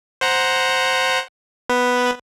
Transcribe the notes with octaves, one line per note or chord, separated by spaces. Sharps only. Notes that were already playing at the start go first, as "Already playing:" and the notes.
C5 F#5 A#5
B3 B4